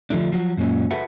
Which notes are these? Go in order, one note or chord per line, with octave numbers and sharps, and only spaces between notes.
D3 F3 F#3 A3 D4
F3 F#3 F#4
F#2 A#2 G#3 C#4
F#4 G#4 A4 B4 E5 F#5